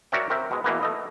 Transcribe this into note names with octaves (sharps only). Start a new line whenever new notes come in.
F#4 A#4 C#5 D5 E5 G5
C4 A#4 E5
B2 G#3
B2 E3 A#3 B3
A3 D#5